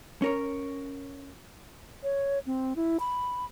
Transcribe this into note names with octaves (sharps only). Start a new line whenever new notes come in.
C#4 A#4 C#5
C#5
C4
E4
B5